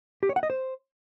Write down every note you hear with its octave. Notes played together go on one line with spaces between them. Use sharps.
G4
C#5
F#5
D#5
C5